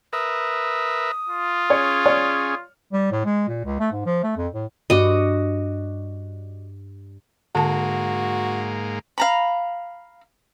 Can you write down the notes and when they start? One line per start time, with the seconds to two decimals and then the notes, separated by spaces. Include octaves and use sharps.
0.13 A#4 B4 E5 D#6
1.29 F4
1.70 C#4 G#4 C#5
2.06 C#5 D5 F6
2.93 G3
3.12 A2
3.25 G#3
3.48 A#2
3.64 C#2
3.80 A3
3.92 G#2
4.06 F3
4.23 A3
4.37 F2
4.54 A2
4.90 G2 F#4 D#5 D6
7.55 G#2 D3 A#3 F#4 A5
9.18 F5 A#5 B5